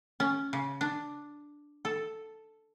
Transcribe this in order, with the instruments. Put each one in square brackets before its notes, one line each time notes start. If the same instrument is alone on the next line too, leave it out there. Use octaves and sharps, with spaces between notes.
[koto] C#4
C#3
D4
A4